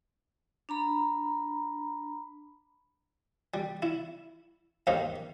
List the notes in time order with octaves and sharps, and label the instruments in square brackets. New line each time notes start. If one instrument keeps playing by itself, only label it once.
[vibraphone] D4 A#5 B5
[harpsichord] G3
E4
D#2 G#2 D#3 D#4 F5